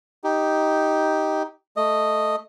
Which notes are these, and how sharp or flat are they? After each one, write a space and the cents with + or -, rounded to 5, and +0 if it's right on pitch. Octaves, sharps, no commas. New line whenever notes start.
D#4 +10 G4 +0
A3 +0 D#5 -5